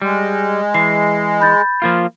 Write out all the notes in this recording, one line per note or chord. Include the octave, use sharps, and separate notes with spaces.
G3 G#3
E3 C7
B5 G6 A6
F3 A#3 F4